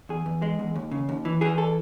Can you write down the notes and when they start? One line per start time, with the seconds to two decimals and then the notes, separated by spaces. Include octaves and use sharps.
0.09 E2 G#4
0.26 E2
0.42 G#3
0.59 E2
0.76 D#2
0.91 C#3
1.09 D#2
1.25 E3
1.41 E3 G#4
1.58 A4